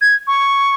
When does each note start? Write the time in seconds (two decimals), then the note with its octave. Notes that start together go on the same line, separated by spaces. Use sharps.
0.01 G#6
0.27 C#6